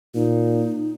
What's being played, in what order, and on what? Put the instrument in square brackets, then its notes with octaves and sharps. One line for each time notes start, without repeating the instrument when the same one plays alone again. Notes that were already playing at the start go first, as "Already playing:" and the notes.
[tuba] A#2 [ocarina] D#4